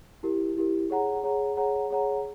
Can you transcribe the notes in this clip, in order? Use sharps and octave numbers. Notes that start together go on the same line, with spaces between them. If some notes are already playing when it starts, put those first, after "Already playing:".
E4 G4 A#4
E4 G4 A#4
G#4 C#5 F#5 A#5
G#4 C#5 F#5 A#5
G#4 C#5 F#5 A#5
G#4 C#5 F#5 A#5